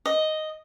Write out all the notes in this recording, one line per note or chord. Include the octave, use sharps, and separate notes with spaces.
D#5